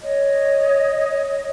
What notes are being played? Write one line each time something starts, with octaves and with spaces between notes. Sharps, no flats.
C#5 D#5